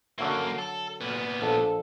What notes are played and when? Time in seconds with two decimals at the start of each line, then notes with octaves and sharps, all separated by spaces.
0.19 F#2 D3 F#3 A#3 E5
0.58 A4
1.01 A#2 B3
1.42 A#1 A4